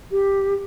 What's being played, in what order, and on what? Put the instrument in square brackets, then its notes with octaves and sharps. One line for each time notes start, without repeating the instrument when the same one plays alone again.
[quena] G4